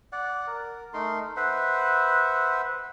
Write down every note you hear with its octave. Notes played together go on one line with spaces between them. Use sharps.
D5 F#5
A#4
A3 D#4 A#4 C6
B4 C5 E5 F#5